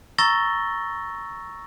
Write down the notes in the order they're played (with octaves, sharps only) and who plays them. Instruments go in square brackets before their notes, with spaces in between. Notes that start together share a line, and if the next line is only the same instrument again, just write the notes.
[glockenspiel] A#5 C#6 E6 A6 A#6 G7